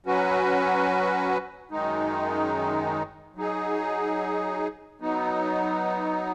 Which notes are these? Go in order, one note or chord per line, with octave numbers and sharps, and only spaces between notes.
F#3 C#4 F#4 B4
F#2 D#3 G#3 D#4
F#3 D#4 G#4
F#3 B3 D#4